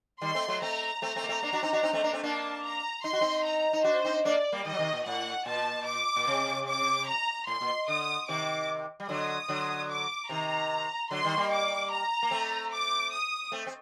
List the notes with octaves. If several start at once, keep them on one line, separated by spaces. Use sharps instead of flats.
D#3 G3 C6
A3 C4
F#3 A3
A3 C4 A#5
A3 C4 A#5
A3 C4
A#3
A3 C4
A#3 D4
D4 F#4
C4 D#4
D4 F#4
C4 D#4
A3 C4
A#3 D4
A3 C4
A#3 D4 A5
A#5
D#4 C6
F#4
C4 D#4
A#5
D#4
D4 F#4 C5
C4 D#4
A#3 D4 D5
G3 A#3
D#3 G3 D#5
F#3
C3 D#3
A#2
A2 F#5
A#2 A5
D6
A#2
C3
D6
A#5
A2 C6
A#2
D3 D#6
C3 D#3 D6
G3
D3 F#3 D#6
D3 F#3
D6
C3 D#3 A#5
D3 F#3 C6
D#3 G3
G3 A#3
D6
A#5
A#3
A3 C4
D6
D#6
A3 C4
C4